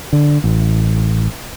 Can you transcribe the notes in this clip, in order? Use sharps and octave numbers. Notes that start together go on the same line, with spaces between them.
D3
A1